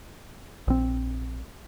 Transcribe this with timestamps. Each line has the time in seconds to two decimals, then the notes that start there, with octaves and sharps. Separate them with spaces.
0.68 A#1 C4